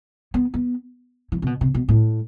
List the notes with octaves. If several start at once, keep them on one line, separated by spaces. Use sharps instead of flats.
B3
B3
E3
C3
B2
C3
B2
A2